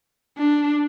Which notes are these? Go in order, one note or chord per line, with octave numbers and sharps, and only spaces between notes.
D4